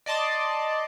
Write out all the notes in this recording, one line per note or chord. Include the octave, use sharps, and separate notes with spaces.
D5 D#5 A5 C6 D6